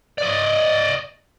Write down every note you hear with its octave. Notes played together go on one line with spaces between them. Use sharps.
D5 D#5